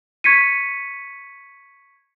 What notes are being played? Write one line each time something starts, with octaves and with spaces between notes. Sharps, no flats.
C#6 G#6 B6 C#7 D#7